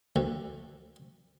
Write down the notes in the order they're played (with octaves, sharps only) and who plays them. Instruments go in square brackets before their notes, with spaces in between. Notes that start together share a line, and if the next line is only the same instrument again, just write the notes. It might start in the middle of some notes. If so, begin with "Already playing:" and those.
[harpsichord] D2